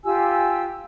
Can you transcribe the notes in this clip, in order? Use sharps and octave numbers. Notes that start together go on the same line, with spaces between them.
F4 G4 G#5 E6